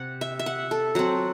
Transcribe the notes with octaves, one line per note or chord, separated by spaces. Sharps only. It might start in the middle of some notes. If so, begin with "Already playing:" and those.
Already playing: C3 F#5
E5
E5
F#5
A4
F#3 C4 F#5